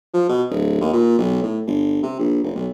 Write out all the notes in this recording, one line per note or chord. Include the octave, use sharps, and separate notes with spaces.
F3
B2
D1
D#2
A#2
B1
A2
G1
C3
A#1
F1
B1